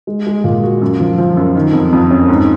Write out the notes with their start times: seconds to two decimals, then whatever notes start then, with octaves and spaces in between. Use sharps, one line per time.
0.07 G#3
0.27 G#3
0.44 A#2
0.64 F#4
0.82 F#2
1.00 F3
1.18 F3
1.37 F#2
1.55 D#3
1.73 F2
1.93 F2
2.11 C#4
2.28 G#2